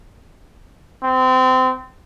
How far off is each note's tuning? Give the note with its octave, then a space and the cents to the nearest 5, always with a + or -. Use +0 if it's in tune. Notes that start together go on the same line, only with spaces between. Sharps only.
C4 -25